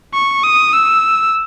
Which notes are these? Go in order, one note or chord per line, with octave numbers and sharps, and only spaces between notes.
C#6
D#6
E6